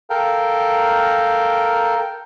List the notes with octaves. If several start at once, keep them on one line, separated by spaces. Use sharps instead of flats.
A4 A#4 F5 G5